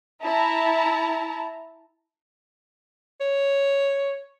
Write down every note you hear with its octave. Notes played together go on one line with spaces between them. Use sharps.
E4 A5 A#5
C#5